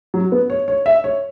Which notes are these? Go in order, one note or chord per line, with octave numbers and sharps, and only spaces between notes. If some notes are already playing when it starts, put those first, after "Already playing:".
F#3
B3
C#5
C#5
E5
C#5